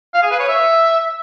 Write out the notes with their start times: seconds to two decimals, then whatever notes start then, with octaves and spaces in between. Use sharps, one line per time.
0.14 F5
0.23 G#4
0.31 B4
0.40 C#5
0.48 E5